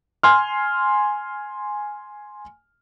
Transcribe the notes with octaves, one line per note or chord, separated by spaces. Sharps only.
G#5 C6 F6